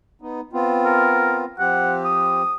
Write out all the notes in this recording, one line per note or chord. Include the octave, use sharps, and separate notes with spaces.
B3 D#4
B3 C4 F4
A#4
F3 C4 G4 F#5
D#6